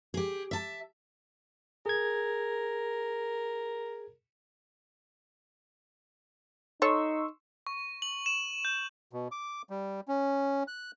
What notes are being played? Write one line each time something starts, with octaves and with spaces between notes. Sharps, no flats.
G4 G#4
E5 A5
G#4 A#4 G#6
D#4 A4 C#5 C6 C#6 E6
C#6
F#7
E7
G6
B2
D6
G3
C#4
F#6